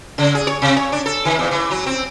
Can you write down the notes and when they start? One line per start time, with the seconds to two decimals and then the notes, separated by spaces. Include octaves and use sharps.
0.18 C#3
0.35 G#4
0.47 C#5
0.62 C3
0.77 C#5
0.92 D4
1.06 A4
1.25 D#3
1.39 E2
1.51 E3
1.71 F#3
1.86 C4